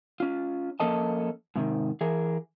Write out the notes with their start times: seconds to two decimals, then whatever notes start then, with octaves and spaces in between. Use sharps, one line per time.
0.20 C#4 F4
0.80 F3 A#3 C#4 A4 D#5 A5
1.56 G#2 C3 D#3
2.01 E3 G#4 A#4